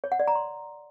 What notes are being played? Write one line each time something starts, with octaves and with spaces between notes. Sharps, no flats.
C#5
F#5
D5
A#5
C6